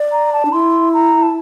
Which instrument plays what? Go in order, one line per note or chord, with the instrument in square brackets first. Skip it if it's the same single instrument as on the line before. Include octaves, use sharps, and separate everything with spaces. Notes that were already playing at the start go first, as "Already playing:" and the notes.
Already playing: [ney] D5
[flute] A#5
A5
[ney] D4
[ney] E4 [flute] C6
[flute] A#5
A5